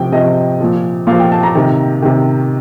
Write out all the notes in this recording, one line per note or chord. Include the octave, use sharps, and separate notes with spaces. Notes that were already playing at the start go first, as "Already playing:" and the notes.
Already playing: C3 F3 G5
C3 F3 D#5
A#2 F3
A#2 F3 F5
G5
A5
A#5
C3 D#3
C3 D#3